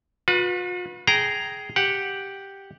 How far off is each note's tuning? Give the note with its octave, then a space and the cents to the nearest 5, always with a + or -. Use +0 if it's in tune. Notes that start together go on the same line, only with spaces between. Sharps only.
F4 +45 B4 -15
G#4 +5 G5 -15 A#5 +0
G4 +0 F#5 +0